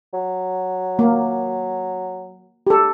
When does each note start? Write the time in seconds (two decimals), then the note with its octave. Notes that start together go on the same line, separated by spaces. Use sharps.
0.14 F#3
0.99 A#3
2.67 G4 A4